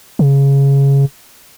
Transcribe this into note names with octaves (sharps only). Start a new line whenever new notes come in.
C#3